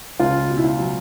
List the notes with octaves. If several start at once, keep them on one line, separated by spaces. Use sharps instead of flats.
C#2 F4
B2
E4
F4
F#3